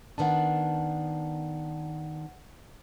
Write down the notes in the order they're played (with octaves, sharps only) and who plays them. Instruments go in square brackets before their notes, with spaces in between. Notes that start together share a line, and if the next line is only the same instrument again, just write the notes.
[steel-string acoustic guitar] D#3 B3 D4 [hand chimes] F#5 A5